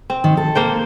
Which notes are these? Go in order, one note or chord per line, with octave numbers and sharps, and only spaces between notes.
C4
D#3
A4
A#3 C5 G5